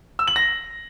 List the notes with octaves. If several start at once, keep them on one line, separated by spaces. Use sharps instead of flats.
E6
F#7
A#6